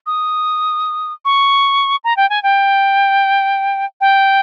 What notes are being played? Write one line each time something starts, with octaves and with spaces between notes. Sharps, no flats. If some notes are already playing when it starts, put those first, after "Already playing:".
D#6
C#6
A#5
G5
G#5
G5
G5